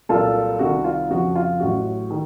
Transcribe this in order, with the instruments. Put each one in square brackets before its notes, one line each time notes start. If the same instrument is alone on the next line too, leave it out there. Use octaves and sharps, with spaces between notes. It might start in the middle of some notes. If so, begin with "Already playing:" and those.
[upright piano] C2 A#2 F#3 F4 A4
C2 C3 D#3 F#4
F4
F2 C#3 F3 F#4
F4
A1 A2 F#3 F#4
D#3